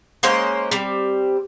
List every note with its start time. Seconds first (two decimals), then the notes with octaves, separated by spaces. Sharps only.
0.23 G#3 A#3 C#4 C5
0.71 G3 C4